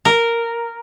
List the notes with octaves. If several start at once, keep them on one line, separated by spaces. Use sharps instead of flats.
A#4